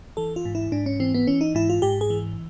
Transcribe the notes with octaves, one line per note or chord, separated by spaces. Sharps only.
E3 A4
F4
G#2
E4
G#2 D4
C#4
E3 C4
B3
E3 C#4
D#4
G#2 E4
F4
G#2 G4
G#4
E3